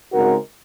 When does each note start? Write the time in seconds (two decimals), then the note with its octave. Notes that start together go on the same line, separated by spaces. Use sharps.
0.12 C#3 G#3 C4 D#4 F#4 A#4